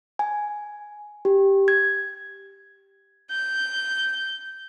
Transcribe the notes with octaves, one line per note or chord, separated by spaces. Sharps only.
G#5
G4
G#6
G6